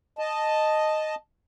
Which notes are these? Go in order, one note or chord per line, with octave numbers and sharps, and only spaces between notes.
D#5 A5